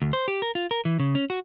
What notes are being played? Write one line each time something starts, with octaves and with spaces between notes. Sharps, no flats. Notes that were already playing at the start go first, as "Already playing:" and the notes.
D2
C5
G4
A#4
F4
A#4
E3
C#3
C#4
F#4